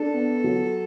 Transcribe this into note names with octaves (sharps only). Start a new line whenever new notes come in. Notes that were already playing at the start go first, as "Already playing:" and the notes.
Already playing: D4 A4
B3
F#3